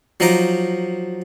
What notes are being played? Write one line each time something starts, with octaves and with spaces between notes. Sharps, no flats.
F3 F#3 D#4 D#5 A#5 D6